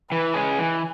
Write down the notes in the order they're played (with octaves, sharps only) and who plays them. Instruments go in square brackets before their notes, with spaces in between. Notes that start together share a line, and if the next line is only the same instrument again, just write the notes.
[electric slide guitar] E3 [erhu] B4
[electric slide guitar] G#3 C#4 G#4
[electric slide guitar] E3 [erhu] G#5